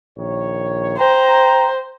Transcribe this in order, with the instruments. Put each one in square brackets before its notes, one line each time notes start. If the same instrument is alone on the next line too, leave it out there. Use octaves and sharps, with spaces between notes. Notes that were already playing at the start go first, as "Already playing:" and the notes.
[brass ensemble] A#1 D#3 C#5
[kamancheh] C5 [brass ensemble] G5 A#5